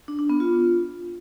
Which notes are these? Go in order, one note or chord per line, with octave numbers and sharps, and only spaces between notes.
D4
D4
B3
F4